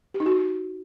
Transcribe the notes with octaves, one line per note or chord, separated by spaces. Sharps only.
G4
D#4
F#4